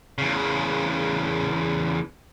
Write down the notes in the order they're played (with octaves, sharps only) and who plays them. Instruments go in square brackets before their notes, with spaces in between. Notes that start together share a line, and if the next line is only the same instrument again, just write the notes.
[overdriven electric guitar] E2 C#3